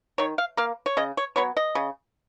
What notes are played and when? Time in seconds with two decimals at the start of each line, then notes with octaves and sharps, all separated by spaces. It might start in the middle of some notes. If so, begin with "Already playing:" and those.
0.18 D#3 C#5
0.38 F5
0.57 A#3 F5
0.86 C#5
0.97 C#3 D#5
1.17 C#5
1.36 F#3 B3 C#5
1.57 D#5
1.75 C#3